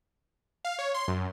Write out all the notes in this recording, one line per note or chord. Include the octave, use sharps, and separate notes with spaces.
F5
C#5
C6
F#2